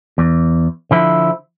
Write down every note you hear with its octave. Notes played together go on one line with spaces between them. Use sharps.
E2
D3 F3 E4